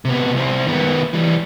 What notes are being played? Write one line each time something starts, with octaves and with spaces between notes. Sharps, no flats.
C3 B3
C2 C4
D#3 B3
E3 G3